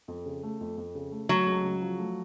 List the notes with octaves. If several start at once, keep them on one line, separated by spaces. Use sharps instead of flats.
F2
C#3
A3
F2
F2
C#3
A3
F#3 A3
C#2
C#3
F3
A3